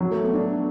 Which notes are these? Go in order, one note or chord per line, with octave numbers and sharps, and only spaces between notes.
F#3
A3
B3
D4